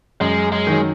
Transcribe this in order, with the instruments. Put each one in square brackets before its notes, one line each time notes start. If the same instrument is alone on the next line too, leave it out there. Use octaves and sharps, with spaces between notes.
[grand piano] F#2 [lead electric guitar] G#3
[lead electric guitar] G#3
[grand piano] D#3 F#3